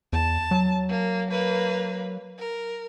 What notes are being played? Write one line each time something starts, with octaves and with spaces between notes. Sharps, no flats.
E2 A5
F#3
A#3
A#3 B4
A#4